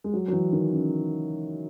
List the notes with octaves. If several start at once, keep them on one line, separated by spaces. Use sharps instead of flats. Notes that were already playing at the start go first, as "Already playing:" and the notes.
G#3
F#3
F#3
E3
D#3
C#3